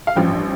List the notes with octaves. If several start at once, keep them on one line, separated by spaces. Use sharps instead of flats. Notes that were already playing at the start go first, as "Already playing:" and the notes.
F5
A1 G2 F3 G5